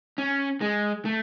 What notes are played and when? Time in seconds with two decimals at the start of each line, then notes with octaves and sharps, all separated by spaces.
0.18 C#4
0.61 G#3
1.05 A3